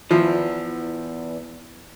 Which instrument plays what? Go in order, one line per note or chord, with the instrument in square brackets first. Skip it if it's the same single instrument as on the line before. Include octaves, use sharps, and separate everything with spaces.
[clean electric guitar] E2 E3 [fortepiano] F3